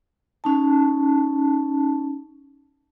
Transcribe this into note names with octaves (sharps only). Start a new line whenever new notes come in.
C#4 D#4 A5